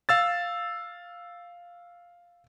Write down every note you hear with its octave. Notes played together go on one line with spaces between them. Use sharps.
F5 E6 A6